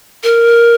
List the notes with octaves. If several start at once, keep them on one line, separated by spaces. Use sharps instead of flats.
A#4